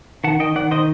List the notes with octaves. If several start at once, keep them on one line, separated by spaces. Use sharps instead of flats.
D#3 F#5 A5
D#3 D#5 G5
D#3 D5 F#5
D#3 C5 D#5